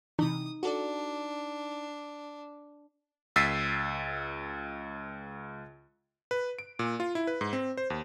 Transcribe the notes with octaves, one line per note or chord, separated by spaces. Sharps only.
C3 E3 D#4 D#6
D4 F#4 A4 D5
C#2 E6 A6 B6 C7 D#7
B4
D7
A#2
F4
E4
B4
G#2
C4
C5
D#2